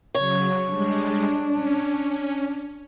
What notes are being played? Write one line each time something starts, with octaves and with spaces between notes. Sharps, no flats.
C#3 F#3 C#5
G3 G#3 D4
C#4